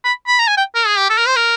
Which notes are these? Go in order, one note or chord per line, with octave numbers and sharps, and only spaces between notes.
B5
B5
A#5
G#5
G5
A#4
G#4
G4
A4
A#4
C5
A#4